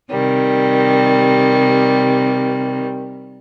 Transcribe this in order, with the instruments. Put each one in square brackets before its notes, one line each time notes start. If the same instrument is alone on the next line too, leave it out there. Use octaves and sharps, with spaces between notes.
[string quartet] C3 D#3 G3